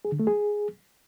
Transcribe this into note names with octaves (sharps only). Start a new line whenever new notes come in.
G#4
D3
A3
G#4